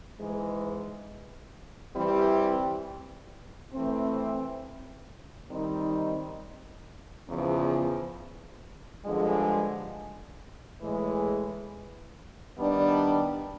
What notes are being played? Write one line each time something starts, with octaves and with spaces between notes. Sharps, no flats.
G#2 E3 G#3
E3 G3 C4 E4 G4
E3 A3 C4
D#3 G3 C4 D#4
E2 C#3 F3
G2 D3 F3 G#3
A2 E3 G#3
D#3 G3 B3 D4